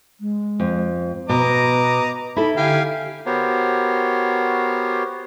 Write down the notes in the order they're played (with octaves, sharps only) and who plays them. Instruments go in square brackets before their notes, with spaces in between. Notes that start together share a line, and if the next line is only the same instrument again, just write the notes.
[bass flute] G#3
[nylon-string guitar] F2
[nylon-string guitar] B2 [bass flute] B4 [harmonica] D#5 A#5 D6
[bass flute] D#4 [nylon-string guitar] E4 A4 [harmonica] B5
[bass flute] D3 [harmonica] G4 F5 G#5
[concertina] B3 F#4 G4 A#4 C5 C#5